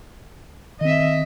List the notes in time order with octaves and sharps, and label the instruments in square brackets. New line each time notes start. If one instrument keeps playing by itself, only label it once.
[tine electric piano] D#3 C4 [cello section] D#5 E5